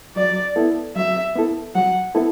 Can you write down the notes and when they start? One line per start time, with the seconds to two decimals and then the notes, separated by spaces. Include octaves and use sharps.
0.16 F#3 D5
0.56 B3 E4 A4
0.96 F#3 E5
1.36 B3 E4 A4
1.75 F#3 F#5
2.15 B3 E4 A4